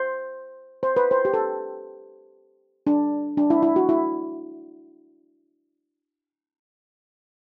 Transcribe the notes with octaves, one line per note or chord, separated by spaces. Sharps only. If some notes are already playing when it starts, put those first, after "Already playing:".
Already playing: C5
C5
B4
C5
G4
A4
D4
D4
E4
E4
F#4
E4